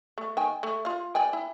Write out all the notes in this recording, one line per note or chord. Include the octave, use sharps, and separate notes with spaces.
A3
D#3 G5 G#5
A3
F4 F5
D5 G5 G#5
E4